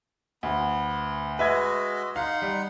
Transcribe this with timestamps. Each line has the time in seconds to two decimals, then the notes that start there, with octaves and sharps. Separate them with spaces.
0.43 D2 B3
1.39 G#3 F#4 B4 D#5 E5 G#6
2.16 D#4 F5 F#5 C6
2.42 G3